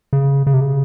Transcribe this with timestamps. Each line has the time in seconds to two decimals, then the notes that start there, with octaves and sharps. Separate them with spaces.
0.13 C#3
0.47 C#3
0.54 C3
0.60 C#3